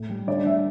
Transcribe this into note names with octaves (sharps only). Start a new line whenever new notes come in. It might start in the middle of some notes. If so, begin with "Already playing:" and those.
Already playing: A2
G3
D3 D5
G3 E5